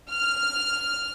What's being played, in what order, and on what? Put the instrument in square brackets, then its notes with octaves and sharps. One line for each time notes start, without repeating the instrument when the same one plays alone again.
[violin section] F6